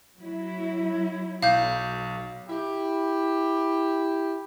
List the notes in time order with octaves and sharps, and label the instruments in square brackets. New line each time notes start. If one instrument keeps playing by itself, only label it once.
[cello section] F#3 E4
[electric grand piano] B1 [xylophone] F5 G6
[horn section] E4 G4